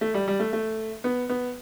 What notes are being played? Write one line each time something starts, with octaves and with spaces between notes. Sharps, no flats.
A3
G3
G3
A3
A3
B3
B3